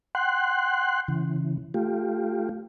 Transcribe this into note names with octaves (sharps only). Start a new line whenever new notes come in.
F#5 G5 C6 F#6
C#3 E3
A3 F4 G4